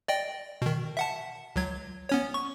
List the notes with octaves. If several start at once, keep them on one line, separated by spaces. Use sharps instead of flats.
D5 D#5 G5
B2 D#3
E5 F#5 A5
C#2 F#3 G#6
B3 C#4 C#5
C#6